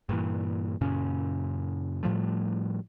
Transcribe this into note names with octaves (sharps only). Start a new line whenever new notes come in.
G2 A#2 E3
F#2 A#2 C#3 C#4
A2 F3 G3 A3